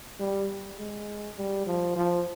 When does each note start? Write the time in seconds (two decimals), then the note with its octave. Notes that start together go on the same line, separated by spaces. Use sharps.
0.20 G3
0.79 G#3
1.37 G3
1.66 F3
1.96 F3